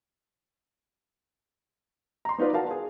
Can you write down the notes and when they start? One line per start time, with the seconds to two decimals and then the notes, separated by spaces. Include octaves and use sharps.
2.25 A#5 C6
2.38 B3 D#4 F4 B4 D5
2.53 F#4 A#4 F5 A5
2.71 G#4